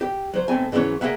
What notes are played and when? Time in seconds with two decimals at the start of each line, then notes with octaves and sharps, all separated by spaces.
0.01 G4
0.33 F#3 C5
0.48 B1 A3 C4 G#5
0.72 G#2 D3 E3 F#3 C#4 C#5
1.01 A#3 C#4 G#4 E5 F#5